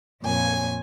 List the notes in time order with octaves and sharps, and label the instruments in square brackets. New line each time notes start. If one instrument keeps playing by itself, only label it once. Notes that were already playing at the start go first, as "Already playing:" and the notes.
[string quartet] F2 A#2 C#5 G#5